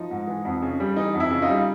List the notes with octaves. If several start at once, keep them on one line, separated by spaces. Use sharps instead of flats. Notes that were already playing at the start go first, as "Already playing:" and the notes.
Already playing: F3 D#4
G#2
E3
F2
C#3
G3
E3 D#4
F2
E4
C#3
D#4 F4
G3